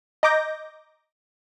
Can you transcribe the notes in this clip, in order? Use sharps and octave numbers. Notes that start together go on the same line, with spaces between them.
D#5 A#5 D6 G6 A#6